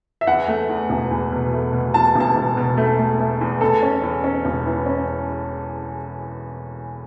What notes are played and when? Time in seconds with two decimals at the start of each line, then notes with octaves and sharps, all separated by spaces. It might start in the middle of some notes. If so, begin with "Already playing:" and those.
0.21 E5
0.27 E2 F#5
0.48 A3
0.69 E2
0.90 E1
1.11 E2
1.32 B2
1.53 A3
1.73 B2
1.94 E2 A5
2.16 E1 A5
2.36 E1
2.57 B2
2.77 A3
2.99 A3
3.20 A3
3.41 E2
3.61 E2 A4
3.82 C#4
4.03 E2
4.24 C#4
4.45 E1
4.66 E3
4.86 C#4